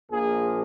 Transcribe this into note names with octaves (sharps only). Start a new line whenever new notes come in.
A#1 A#2 F3 A#3 G#4